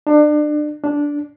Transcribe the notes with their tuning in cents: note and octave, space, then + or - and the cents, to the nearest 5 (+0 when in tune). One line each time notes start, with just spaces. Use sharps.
D4 +30
D4 -10